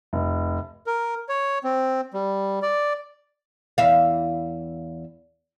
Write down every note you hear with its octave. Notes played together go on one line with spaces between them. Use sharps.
F1
A#4
C#5
C4
G3
D5
E2 E5 F5